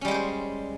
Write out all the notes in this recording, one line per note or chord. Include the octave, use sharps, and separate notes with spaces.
G3 G#3 C#4 G4 C5